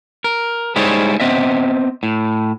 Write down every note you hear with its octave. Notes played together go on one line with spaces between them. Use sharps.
A#4
G3 G#3 D#4 E4 C5 C#5
B3 C4 D#5 E5
A2